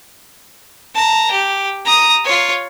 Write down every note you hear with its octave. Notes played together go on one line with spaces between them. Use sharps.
A5 A#5
G4
A#5 D#6
F4 C#5